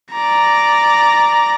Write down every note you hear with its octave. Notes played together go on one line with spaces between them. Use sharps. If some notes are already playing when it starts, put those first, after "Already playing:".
D5 A#5